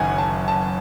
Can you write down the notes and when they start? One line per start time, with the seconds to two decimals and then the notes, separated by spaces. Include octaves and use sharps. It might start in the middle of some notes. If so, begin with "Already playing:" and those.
Already playing: F#1 F#2 D#3 F#5 G#5
0.18 A5
0.48 A5